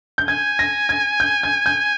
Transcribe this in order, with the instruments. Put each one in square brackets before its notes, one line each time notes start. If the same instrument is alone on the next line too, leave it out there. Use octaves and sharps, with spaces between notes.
[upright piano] G6
[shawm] G#5 [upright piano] G#6
[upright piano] A#6
G#6
G6
G#6
G6